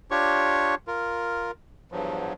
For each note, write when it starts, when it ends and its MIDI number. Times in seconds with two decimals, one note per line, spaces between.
0.11 0.75 62
0.11 0.75 65
0.11 0.75 67
0.11 0.75 73
0.11 0.75 85
0.87 1.51 65
0.87 1.51 70
1.92 2.33 40
1.92 2.33 43
1.92 2.33 53
1.92 2.33 54